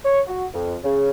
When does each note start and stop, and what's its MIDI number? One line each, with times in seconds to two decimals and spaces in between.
0.04 0.20 73
0.27 0.45 66
0.53 0.76 41
0.84 1.10 49